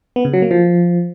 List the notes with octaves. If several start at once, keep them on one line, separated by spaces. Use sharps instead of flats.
B3
C#3
F#3
A#3
F3